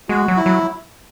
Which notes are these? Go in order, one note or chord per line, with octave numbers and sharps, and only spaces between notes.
G#3 F#4
F#3
E4
F#3